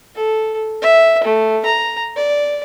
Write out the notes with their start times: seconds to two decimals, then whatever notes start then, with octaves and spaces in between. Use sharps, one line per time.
0.15 A4
0.82 E5
1.23 A3
1.65 A#5
2.16 D5